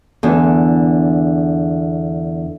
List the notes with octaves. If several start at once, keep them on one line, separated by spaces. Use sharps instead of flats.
E2 D3